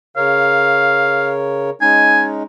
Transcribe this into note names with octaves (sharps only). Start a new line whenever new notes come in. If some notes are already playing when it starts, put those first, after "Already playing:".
C#3 A#4 C#5 F5
G#3 C#4 D#4 G#5